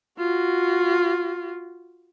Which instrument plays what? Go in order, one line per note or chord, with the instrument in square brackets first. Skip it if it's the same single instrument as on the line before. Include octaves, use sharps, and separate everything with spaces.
[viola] F4 F#4